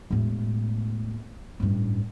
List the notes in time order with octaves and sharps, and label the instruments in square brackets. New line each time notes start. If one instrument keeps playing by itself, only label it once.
[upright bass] E1 A2
A1 G2